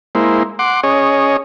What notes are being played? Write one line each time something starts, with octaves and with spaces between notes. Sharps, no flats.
G#3 A#3 E4 C5
F#5 C6 D6
C#4 G#4 C#5 D#5